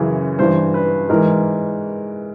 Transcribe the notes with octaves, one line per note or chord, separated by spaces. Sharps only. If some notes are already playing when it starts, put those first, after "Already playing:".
Already playing: F#2 C#3 E3
G2 E3 C5
B4
G#2 E3 A#4